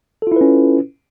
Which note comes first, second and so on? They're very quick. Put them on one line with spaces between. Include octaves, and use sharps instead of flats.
A4 F4 E4 B4 C#4